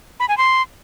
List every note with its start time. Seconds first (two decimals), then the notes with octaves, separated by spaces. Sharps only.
0.20 B5
0.29 G#5
0.38 C6